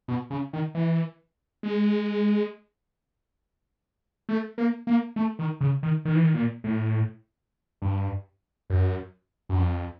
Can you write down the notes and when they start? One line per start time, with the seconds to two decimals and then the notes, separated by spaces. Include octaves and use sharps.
0.08 B2
0.30 C#3
0.53 D#3
0.75 E3
1.63 G#3
4.29 A3
4.58 A#3
4.87 A#3
5.16 A3
5.39 D#3
5.61 C#3
5.83 D#3
6.05 D#3
6.15 E3
6.24 D#3
6.34 A#2
6.64 A2
7.82 G2
8.70 F#2
9.49 F#2
9.58 F2